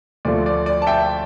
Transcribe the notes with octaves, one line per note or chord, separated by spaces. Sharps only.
D2 D3 F3 A3 D5
D5
D5
A5
E5 G5